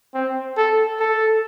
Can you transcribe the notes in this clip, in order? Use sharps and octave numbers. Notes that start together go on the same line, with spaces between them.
C4
A4
A4